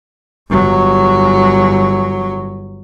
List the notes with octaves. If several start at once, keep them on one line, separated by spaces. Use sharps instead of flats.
G1 F#3